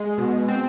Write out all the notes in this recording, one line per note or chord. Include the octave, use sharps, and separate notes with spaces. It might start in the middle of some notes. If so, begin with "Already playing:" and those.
Already playing: G#3
B2
C4